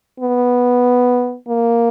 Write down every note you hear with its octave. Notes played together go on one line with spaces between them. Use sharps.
B3
A#3